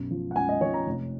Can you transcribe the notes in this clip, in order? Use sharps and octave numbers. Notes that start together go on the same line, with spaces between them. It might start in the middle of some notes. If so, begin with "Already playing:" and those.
Already playing: B1 F#2
F3
F#5
F#2 G#5
D#5
F3 C#5
A#5
F1